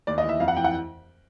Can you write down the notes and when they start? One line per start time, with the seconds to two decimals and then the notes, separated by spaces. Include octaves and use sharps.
0.07 D#2 D5
0.18 D#5
0.24 E3
0.29 E5
0.40 F2 F5
0.48 F#5
0.57 E3 G5
0.64 F#5